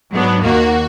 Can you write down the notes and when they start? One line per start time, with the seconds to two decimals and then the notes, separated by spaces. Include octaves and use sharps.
0.12 G#2 F#3 B3 D4
0.43 D#2 D#3 A#3 F#4